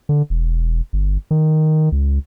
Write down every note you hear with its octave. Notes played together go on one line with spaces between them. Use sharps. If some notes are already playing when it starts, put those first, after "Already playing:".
D3
E1
G1
D#3
C#2